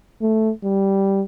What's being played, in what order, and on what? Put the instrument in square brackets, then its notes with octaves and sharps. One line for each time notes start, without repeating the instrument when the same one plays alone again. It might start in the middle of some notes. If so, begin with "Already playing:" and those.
[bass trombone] A3
G3